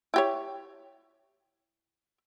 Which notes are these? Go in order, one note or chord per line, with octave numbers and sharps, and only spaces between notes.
E4 G4 C#5